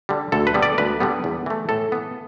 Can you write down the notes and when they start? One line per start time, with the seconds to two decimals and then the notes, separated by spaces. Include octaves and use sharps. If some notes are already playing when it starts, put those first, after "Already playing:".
0.09 D3 G3
0.32 D2 A4
0.47 B4
0.54 D3 G3 B3
0.63 D5
0.78 D2 B4
1.00 D3 G3 B3
1.24 E2
1.46 E3 A3
1.69 A2 A4
1.92 E3 B3